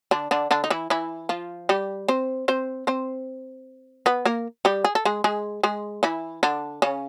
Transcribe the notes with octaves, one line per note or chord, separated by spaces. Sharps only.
D3 D4
D3 D4
D3 D4
D#4
E3 E4
E3 E4
F3 F4
G3 G4
C4 C5
C4 C5
C4 C5
B3 B4
A#3 A#4
G3 G4
G#4
A4
G#3 G#4
G#3 G#4
G#3 G#4
E3 E4
D3 D4
C#3 C#4